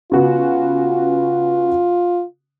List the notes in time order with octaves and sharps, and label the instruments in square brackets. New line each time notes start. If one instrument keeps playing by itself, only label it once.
[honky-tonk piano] C#3 B3 F#4 [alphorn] F4